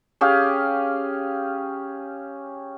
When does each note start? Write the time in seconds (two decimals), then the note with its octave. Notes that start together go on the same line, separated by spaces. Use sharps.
0.21 C#4 G4 G#4 F5